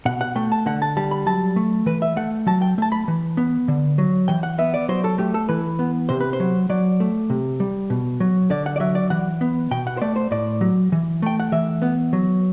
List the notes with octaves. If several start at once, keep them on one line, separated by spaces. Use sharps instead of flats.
B2 F#5
F#5
A3 G5
A5
D3 F#5
A5
G3 A5
B5
F#3 A5
A3
E3 B4
E5
A3 F#5
F#3 A5
G5
A3 A5
B5
E3
B3
D3
F#3
E3 G5
F#5
B3 E5
D5
F#3 C5
A4
A3 G4
A4
E3 B4
B3
C3 C5
B4
C5
F#3
F#3 D5
A3
C3
G3
B2
F#3
D3 D5
F#5
D5
F#3 E5
D5
E3 F#5
B3
B2 G5
F#5
C5
A3 D5
C5
A2 D5
F#3
E3
A3 G5
F#5
E3 E5
B3
F#3